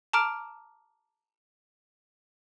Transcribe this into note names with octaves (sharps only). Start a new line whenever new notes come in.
A5 A#5 D6 F6 D7